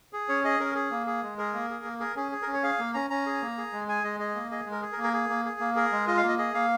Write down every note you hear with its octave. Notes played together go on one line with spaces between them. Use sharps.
G#4
C#4 C#5
G#4 D#5
C#4 A#4
G#4
A#3
G#4
G#3
G#4 A#4
A#3
G#4
A#3
G#4 A#4
C#4 G#4
G#4
A#4
C#4
C#5
G#4 F5
A#3
C#4 A#5
C#4 A#5
G#4
A#3
G#4
G#3
G#4 G#5
G#3 D#5
G#4 D#5
A#3
G#4 D#5
G#3
A#4
G#4
A#4
A#3
A#4
G#4
A#3
G#4
A#3
G#4 A#4
G#3
F4 D#5
F5
A#3 D#5
G#4 D#5
A#3 F5